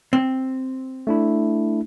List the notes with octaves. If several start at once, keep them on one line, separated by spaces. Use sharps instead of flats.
C4
A3 D4 E4